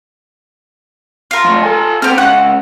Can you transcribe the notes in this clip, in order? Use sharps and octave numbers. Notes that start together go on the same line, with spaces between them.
F4 A#4
F3 A3
A4 G#5
B3 C4 G4 F6
C#2 C#4 F#5